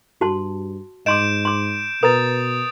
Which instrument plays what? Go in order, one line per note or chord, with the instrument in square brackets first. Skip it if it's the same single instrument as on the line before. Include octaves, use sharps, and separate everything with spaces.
[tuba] G2 [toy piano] F#4 A5 C6
[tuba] G#2 [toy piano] D#5 C6 D6 [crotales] G6 D7 E7
[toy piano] C6 D6
[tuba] B2 [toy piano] A#4 B4 A#5 [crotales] D#6 A6